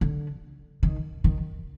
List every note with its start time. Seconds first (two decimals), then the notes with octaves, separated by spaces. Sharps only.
0.01 D3
0.83 D#3
1.24 D#3